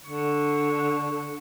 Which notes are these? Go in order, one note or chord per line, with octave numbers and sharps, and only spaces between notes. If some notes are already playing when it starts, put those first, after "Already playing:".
D3 C#6